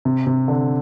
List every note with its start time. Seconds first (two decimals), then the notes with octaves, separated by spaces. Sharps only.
0.05 C3
0.27 C3
0.48 D3